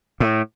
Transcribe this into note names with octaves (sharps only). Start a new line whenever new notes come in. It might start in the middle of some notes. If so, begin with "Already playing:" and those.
A2